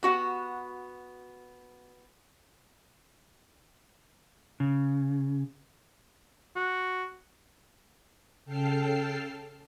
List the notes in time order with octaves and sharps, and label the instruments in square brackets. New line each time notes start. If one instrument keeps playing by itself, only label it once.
[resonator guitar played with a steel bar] B3 F#4 F#5
[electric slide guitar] C#3
[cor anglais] F#4
[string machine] C#3 A4 G5 A5 F6 C7